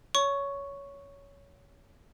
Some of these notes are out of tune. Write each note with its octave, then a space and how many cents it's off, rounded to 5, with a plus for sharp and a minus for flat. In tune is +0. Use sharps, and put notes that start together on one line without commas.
C#5 +15 C#6 +0